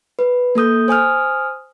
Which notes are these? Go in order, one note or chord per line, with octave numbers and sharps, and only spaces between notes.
B4
A#3 A4 D#6 G6
C5 G#5 D#6 F6